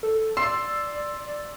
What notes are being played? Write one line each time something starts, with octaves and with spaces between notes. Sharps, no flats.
A4
D5 C6 E6 C7